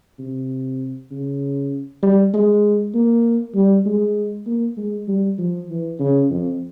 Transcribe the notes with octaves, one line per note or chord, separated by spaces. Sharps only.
C3
C#3
G3
G#3
A#3
G3
G#3
A#3
G#3
G3
F3
E3
C#3
F2